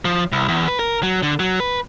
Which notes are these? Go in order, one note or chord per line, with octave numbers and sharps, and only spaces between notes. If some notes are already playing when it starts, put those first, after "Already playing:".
F3
C2
E2
B4
A#4
F#3
D3
F#3
B4